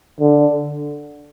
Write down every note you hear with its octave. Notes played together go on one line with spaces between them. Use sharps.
D3